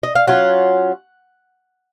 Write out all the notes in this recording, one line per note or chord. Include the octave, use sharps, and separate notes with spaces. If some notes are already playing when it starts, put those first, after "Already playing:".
D#5
F5
F#3 C#4 F4 F#5